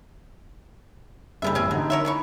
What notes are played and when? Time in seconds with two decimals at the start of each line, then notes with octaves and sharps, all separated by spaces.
1.42 F#1 G2 G3 B3 E5
1.55 A1 C4 C#4 G#5 E6
1.71 D3 F#3 D#4
1.90 A#4 C#5 E5
2.05 E3 B5 C#6